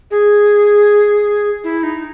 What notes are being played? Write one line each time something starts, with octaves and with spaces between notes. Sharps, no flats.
G#4
E4
D#4